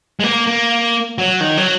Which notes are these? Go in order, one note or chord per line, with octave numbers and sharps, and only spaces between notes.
G#3
A#3
A#3
F#3
D#3
F#3